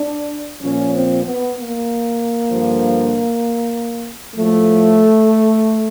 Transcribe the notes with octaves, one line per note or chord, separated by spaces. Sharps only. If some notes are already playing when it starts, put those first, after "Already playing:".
Already playing: D4
A#2 F3 C#4
C4
B3
A#3
G2 D3 F3
A2 F3 A3